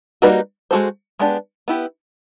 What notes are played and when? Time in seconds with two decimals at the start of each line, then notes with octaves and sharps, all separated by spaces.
0.22 G3 A#3 D#4 F#4 B4
0.71 G#3 C#4 F#4 A4 C5
1.19 G#3 B3 D4 G4
1.68 B3 E4 G4